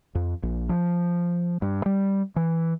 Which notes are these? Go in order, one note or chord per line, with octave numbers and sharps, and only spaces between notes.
F2
A#1
F3
G2
G3
E3